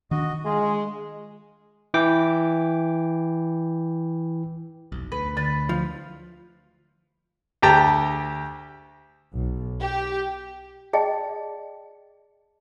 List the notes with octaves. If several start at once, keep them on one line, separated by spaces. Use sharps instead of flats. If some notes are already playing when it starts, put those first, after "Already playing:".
D#3 D4 F#4 D#5
G#3 F4 G#4
E3 G5 D6
F1 B1
D2 B4
D3 B4 A6
F3
D2 G4 G5 A5 A#5
B1
G4
G#4 D5 D#5 G5 A5